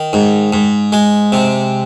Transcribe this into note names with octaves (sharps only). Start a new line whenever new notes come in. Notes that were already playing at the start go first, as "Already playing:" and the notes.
Already playing: D#3
G#2
G#2
G#3
C3